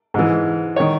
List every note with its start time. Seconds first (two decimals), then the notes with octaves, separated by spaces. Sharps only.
0.14 G#2 E3
0.76 D#3 C#5